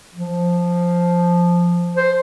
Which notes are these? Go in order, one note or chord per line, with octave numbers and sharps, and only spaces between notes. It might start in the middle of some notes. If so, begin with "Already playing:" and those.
F3
C5